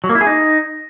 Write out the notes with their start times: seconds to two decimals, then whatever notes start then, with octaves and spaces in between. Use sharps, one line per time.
0.04 F#3
0.09 A#3
0.15 E4
0.21 G#4
0.27 D#4